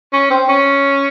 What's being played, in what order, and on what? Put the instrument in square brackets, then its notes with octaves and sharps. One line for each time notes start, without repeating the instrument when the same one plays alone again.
[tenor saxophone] C#4
C4
C#4